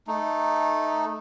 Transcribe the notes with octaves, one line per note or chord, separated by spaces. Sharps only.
A3 D#4